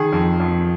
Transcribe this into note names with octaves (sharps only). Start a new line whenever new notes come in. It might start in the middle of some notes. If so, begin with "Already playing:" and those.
Already playing: D#3 G#4
F2
F2